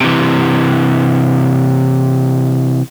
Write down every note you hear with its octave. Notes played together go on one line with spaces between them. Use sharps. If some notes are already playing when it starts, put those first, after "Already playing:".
C3 E3